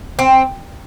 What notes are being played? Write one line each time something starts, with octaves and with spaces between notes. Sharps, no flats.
C4